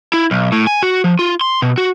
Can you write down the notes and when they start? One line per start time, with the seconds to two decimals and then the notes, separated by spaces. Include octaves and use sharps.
0.14 E4
0.31 B1
0.52 A2
0.67 G#5
0.83 F#4
1.04 F3
1.19 F4
1.41 C6
1.62 B2
1.78 F#4